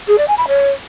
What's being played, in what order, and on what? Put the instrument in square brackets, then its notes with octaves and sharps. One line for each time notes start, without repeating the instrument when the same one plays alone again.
[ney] G#4
D5
G#5
B5
C#5